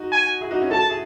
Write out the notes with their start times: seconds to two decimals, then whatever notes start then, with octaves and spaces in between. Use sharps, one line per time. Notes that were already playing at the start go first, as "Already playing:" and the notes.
Already playing: D#4 F#4
0.12 G#5
0.41 E4 G#4
0.51 D#4 F#4
0.61 C#4 E4
0.71 F#4 A4 A5
0.90 E4 G#4